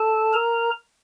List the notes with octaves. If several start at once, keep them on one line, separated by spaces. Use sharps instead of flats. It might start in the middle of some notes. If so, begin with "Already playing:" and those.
Already playing: A4 A5
A#4 A#5